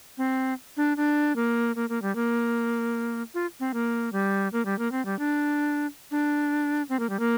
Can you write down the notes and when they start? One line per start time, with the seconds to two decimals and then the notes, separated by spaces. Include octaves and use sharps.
0.18 C4
0.77 D4
0.97 D4
1.36 A#3
1.76 A#3
1.89 A#3
2.02 G3
2.15 A#3
3.34 F4
3.60 C4
3.74 A#3
4.12 G3
4.53 A#3
4.65 G3
4.79 A#3
4.92 C4
5.05 G3
5.19 D4
6.11 D4
6.89 C4
6.99 A#3
7.09 G3
7.19 A#3